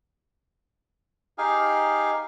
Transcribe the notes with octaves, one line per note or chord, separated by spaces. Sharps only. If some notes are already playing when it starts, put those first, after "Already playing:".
D#4 G4 G#4 F5